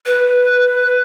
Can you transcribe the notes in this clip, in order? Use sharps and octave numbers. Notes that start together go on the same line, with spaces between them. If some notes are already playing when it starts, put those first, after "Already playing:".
B4